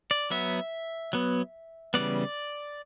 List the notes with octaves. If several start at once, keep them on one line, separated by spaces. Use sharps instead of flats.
D5
F#3 B3 E5
F#3 B3
C#3 E3 G3 B3 D5